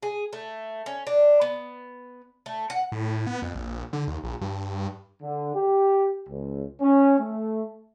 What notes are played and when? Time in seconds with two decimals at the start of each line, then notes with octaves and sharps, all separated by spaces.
0.02 G#4
0.33 A3
0.86 C#4
1.07 D4
1.41 B3
2.46 A3
2.70 F#5
2.92 A2
3.27 B3
3.42 F2
3.55 A#1
3.93 D3
4.08 D#2
4.24 A#1
4.41 G2
5.22 D3
5.55 G4
6.29 C#2
6.80 C#4
7.19 A3